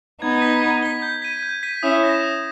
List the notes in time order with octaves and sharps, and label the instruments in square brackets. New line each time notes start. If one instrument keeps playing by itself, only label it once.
[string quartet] B3 D#4 [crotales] G#6
[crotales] B6 G7
G#6
B6 G7
G6
B6 D#7
G6
B6 D#7
[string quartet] C#4 E4 [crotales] D#6
[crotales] A#6 E7
D#6